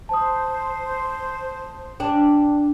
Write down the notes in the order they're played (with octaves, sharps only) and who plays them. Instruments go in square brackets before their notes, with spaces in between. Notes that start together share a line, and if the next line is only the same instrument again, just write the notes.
[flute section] C5 [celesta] A5 D#6
[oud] D4 [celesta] G5 A5